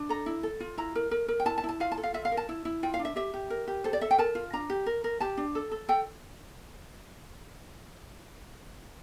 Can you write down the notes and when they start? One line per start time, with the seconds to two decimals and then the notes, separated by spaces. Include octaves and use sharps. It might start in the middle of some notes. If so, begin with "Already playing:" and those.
Already playing: D4
0.09 A4 A#5
0.26 E4
0.43 A4
0.60 F4
0.78 E4 A#5
0.95 A#4
1.11 A#4
1.28 A#4
1.40 G5
1.45 E4 A5
1.58 A5
1.64 E4
1.69 A5
1.80 F4 F5
1.92 A5
1.97 A4
2.03 F5
2.14 F4 E5
2.25 F5
2.32 A#4
2.37 A5
2.49 E4
2.65 E4
2.83 F4 G5
2.94 F5
2.99 D4
3.05 E5
3.16 G4 E5
3.34 G4
3.50 A#4
3.68 G4
3.84 A4 C5
3.93 D5
4.01 A4 E5
4.11 G5
4.18 A#4 A5
4.35 F4
4.53 D4 A#5
4.70 G4
4.86 A#4
5.04 A#4
5.20 G4 A5
5.37 D4
5.55 A4
5.71 A4
5.89 A4 G5